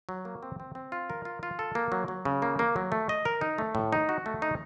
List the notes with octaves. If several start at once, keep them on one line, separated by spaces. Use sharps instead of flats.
F#3
A#3
C4
C4
C4
F4
A#4
F4
F4
A4
A#3
F#3
F#3
C#3
A#3
A#3
F#3
A3
D#5
A#4
D#4
A3
A2
D#4
F#4
A3
D#4